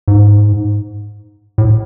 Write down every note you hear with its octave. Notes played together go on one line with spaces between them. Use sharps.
G#2
A2